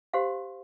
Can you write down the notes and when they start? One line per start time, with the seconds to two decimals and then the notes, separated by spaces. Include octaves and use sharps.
0.13 G4 C5 F5 C6